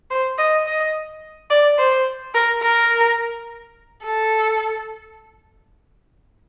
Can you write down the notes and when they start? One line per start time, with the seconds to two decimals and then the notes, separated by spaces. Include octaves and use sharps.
0.11 C5
0.39 D#5
0.67 D#5
1.50 D5
1.79 C5
2.35 A#4
2.63 A#4
4.03 A4